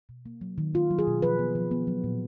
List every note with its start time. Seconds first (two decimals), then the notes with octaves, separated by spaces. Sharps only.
0.09 B2
0.26 A#3
0.41 F#3
0.58 D#3
0.74 A#3 F4
0.91 F#3
0.99 G#4
1.07 B2
1.22 F3 B4
1.39 B3
1.55 F3
1.71 B3
1.87 F#3
2.04 A#2